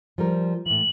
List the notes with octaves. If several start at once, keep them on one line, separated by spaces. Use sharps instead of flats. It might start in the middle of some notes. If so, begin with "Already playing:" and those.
F3 G3 A#4
A2 E3 F#7